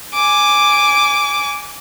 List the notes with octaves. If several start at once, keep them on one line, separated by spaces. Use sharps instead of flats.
G#5 D6